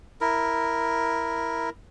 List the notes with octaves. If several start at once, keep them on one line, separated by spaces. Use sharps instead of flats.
E4 A#4